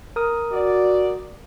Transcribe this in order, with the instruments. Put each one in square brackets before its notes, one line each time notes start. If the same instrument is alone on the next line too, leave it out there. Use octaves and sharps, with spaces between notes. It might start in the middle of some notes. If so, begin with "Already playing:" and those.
[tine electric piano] A#4 D#6
[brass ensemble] F#4 D5